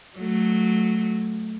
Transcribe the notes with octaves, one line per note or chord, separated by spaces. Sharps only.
F#3 A3